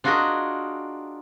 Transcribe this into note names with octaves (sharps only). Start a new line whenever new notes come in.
D4 F4 F#4 G#4 A#4 D#5